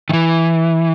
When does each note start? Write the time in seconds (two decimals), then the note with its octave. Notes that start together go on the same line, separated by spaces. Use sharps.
0.09 D#3
0.13 E3